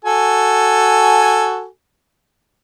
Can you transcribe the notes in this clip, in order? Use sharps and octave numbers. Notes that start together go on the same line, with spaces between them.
F#4 A4 G#5